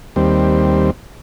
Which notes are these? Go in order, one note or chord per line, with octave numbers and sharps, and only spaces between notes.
D#2 G3 C4